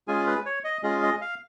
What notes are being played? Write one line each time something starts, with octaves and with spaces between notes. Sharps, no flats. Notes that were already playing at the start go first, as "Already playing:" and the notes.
G#3 C#4 F4 G#4 G#5
B4
C#5
D#5
G#3 C#4 F4 G#4 D#5
D#5
F5